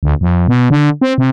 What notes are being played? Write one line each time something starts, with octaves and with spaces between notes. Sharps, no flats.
D2
F2
B2
D3
C4
C3